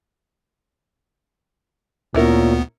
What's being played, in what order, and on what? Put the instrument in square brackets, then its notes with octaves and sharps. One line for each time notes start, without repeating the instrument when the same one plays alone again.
[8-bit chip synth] D2 B3 [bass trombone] A#2 [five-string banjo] C#4 E4 A#4